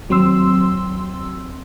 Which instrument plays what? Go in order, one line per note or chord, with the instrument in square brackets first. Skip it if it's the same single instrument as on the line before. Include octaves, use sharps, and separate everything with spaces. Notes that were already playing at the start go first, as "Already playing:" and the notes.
[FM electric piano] D#2 F#3 C4 C6 E6